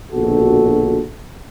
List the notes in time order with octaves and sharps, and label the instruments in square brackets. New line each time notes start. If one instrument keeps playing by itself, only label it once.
[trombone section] A#1 B2 D3 F#4 A4